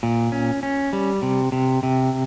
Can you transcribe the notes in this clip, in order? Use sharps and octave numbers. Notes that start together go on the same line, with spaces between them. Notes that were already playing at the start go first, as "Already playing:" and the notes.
A#2
C#4
C#4
G3
C3
C3
C3